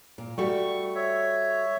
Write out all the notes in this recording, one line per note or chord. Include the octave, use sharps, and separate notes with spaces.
A#2
G3 A3 F#4 C#6
C#5 E5